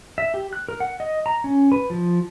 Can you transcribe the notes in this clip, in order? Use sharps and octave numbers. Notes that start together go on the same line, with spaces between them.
E5
G4
F#6
A#4
F#5
D#5
A#5
C#4
B4
F3